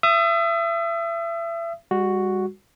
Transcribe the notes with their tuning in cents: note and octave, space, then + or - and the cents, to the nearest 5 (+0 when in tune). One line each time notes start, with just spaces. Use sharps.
E5 +30 D#6 +0
G3 +40 F#4 +0